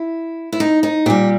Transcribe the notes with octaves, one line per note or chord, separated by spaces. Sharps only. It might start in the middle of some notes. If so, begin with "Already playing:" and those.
Already playing: E4
E4
D#4
D#4
A#2 G3 G4